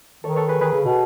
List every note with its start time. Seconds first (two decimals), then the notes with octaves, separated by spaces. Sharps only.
0.24 D#3 A4 C#5
0.33 B4
0.36 A4 C#5
0.49 G#4 B4
0.61 D#3 G#4 B4
0.73 C#3
0.85 B2